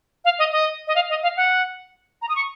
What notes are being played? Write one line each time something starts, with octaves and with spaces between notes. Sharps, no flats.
F5
D#5
D#5
D#5
F5
D#5
F5
F#5
A#5
D#6
C#6